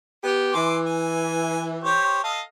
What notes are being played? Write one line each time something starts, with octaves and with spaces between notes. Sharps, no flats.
B3 G4
E3 G#5 C6 D6
G#5
G4 C5 C#5
A4 D#5 F5